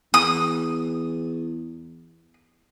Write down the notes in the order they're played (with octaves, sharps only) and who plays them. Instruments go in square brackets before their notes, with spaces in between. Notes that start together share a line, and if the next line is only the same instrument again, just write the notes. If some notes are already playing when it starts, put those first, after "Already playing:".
[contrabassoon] E2 [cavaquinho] D#6